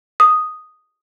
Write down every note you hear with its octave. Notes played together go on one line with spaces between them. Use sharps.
D#6